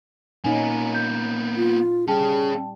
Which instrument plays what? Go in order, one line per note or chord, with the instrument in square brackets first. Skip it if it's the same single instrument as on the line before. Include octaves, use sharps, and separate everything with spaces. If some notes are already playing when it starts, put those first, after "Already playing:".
[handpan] A#2 C#4 D#4 [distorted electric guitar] A#3 B3 [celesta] G#5
[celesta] G6
[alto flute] F4
[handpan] G3 [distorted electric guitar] C#4 F5 [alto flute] G#4 [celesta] G5 A5